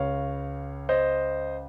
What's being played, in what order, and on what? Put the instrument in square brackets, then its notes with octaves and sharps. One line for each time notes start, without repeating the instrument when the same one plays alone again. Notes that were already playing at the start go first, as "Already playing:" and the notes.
Already playing: [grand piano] C#2 C#3 C#5 F5
C5 D#5